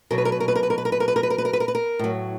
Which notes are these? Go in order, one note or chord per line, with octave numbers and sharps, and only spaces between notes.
B2 F#3 A#4
B4
A#4
B4
A#4
B4
A#4
B4
A#4
B4
A#4
B4
A#4
B4
A#4
B4
A#4
B4
A#4
B4
A#4
B4
A#4
A2 F#3